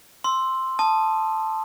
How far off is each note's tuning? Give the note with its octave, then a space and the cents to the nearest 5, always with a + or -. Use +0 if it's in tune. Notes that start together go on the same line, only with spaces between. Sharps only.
C6 +0 E6 +0
A5 +0 D#6 -25